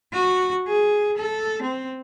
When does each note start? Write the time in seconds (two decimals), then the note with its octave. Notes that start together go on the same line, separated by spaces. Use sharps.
0.13 F#4
0.68 G#4
1.17 A4
1.63 C4